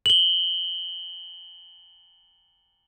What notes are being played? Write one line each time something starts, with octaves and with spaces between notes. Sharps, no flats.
F#7 G7